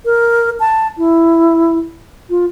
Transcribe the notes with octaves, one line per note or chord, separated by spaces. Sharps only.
A#4
A5
E4
F4